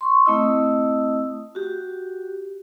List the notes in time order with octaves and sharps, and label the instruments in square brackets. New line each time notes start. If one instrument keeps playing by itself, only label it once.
[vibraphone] C6 C#6
A3 C4 E4 D#5 D#6 E6
F#4 G4